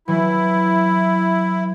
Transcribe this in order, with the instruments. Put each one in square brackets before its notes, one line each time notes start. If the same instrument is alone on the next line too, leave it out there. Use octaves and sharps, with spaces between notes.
[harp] E3 F#3 [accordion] E4